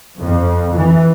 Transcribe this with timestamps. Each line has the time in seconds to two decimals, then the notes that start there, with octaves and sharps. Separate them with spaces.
0.19 F2
0.75 E3